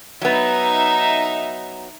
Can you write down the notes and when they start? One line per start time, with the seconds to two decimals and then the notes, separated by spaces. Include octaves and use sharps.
0.22 F#3 B3 D#4 E5